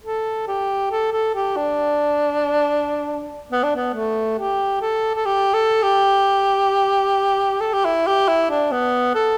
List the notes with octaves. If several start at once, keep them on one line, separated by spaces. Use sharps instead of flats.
A4
G4
A4
A4
G4
D4
B3
D4
B3
A3
G4
A4
A4
G4
A4
G4
A4
G4
E4
G4
E4
D4
B3
A4